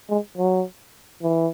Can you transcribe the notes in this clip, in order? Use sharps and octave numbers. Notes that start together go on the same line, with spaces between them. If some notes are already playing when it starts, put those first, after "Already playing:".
G#3
F#3
E3